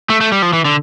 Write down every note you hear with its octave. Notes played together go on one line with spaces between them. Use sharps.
A3
A3
G3
F3
E3
D3